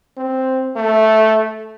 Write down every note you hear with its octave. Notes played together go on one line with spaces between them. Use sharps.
C4
A3